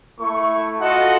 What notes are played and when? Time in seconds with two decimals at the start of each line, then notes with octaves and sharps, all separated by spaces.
0.20 A3 E4 C#6
0.80 F4 F#4 A4 D#5 F#5